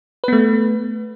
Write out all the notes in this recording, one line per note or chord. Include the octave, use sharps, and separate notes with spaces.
A3 B3 B4